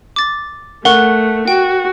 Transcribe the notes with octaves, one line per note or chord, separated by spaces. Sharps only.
D6 A6
A3 A#4 F#5 C#6
F#4 G5